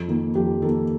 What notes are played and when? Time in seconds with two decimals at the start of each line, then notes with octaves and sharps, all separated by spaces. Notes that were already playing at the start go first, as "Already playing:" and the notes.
Already playing: F2
0.08 D#3 A#3
0.35 F2 G4
0.62 D#3 A#3 A4